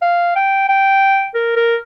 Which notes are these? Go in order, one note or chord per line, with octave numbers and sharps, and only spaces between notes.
F5
G5
G5
A#4
A#4